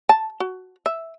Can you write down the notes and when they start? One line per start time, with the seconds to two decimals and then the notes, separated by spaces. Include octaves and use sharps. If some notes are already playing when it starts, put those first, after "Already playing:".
0.09 A5
0.40 F#4
0.86 E5